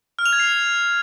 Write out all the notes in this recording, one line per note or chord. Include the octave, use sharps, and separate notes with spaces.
F6
F7
G#6
C7